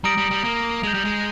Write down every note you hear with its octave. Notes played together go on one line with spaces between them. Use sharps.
G3 A#5 D#6 A#6 D7
G3
G3
A#3
G#3 G6 A#6 D7 F7
G3
G#3